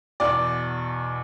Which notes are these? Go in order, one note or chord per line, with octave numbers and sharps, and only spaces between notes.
E2 B2 D5